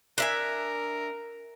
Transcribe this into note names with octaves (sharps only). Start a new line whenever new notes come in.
D4 A#4 E5 G#5